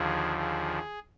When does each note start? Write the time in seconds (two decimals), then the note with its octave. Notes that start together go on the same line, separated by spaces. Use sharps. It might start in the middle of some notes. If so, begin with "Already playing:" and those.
Already playing: D#2 D3 F3 G#4
0.39 G#4